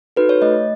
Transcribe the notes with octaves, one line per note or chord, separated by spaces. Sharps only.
D#4 F#4 A4 B4
C#5
A3 D#5